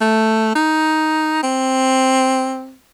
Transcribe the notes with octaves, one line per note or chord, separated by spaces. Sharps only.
A3
D#4
C4